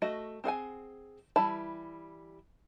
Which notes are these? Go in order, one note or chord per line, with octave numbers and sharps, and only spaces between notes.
A3 F#4 D#5
C4 G#4 F#5 G#5
E3 G3 E4 A5 B5